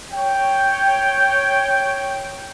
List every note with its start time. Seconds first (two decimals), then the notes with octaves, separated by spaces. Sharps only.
0.12 C#5 G5